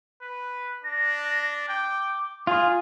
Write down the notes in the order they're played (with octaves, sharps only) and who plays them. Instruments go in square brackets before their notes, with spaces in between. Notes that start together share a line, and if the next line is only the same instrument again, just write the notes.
[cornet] B4
[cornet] D4 [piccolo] A#6
[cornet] G5 [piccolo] D6
[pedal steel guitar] F4 [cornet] G#4 [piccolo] G#5